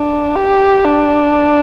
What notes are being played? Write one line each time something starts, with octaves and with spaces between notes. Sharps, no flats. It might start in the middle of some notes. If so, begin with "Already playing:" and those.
Already playing: D4
G4
D4